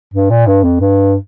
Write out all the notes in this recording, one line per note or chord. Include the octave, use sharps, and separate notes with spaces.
G2
A#2
G2
F2
G2